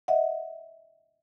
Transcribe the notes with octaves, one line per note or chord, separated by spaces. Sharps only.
D#5 E5 F#5